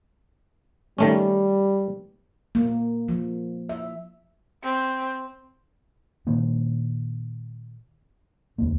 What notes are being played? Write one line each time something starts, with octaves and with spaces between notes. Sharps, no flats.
D#3 G3 A3 C#4
A#3
F3
E5
C4
A#2 D#3 A#3 D4
E1 D2 A#3